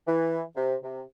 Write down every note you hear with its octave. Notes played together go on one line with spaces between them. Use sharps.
E3
C3
C3